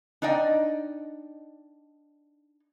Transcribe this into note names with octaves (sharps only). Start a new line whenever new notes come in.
D4 D#4 D5 D#5 G5